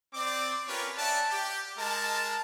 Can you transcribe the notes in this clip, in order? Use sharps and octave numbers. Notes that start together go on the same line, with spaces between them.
C4 D5 D6
C#4 F4 G4 A#4 B4 C#5
C#4 D5 E5 F#5 A5
G4
G#3 A#4 D#5 A5